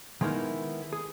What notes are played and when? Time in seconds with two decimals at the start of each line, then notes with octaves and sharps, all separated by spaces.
0.21 D#3 G#3 A#3 B3 D#4 E4
0.93 G#4